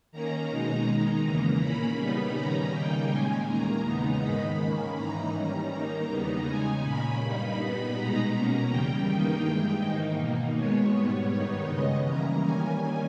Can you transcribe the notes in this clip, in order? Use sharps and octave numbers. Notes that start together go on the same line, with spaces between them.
D#3 A#3 C#4 A#5
B2 G#3 D#4 A#5
D#3 G#3 D#4 A#5
E2 C#3 E3 A#3
A#2 A#3 C#4 B5
C#3 G3 B3 D#4
D#3 G3 C#4 A#5
C#3 G3 A#3 D#4 G5
A#2 G#3 C#4 G#5
E2 D#3 A#3 A#5
E2 C#3 G#3 B3 D#4
G#2 D#3 G#3 D#4 B5
D#3 A#3 C#4
G#2 E3 A#3 D#4 A#5
D#3 G3 C#4 A#5
D#3 A#3 D#4 A#5
E2 C#3 G3 B3 D#4
C#3 G#3 D#4 G#5
A#2 A#3 C#4 B5
G2 G3 A#3 D#4
A#2 G3 B3 D#4
B2 G#3 D#4 A#5
B2 A#3 C#4
E2 C#3 G3 G5
G2 D#3 A#3 D#4
G2 E3 G#3
G#2 D#3 A#3 D#4
B2 A#3 D#4
B2 G#3 B3 C#5
G#2 G3 B3
G2 D#3 G3 B3 D#4 C#5
C#3 G#3 B3 D#5
C#3 E3 G3 A#3 C#4 A#5
D#3 G3 A#3 C#4 G#5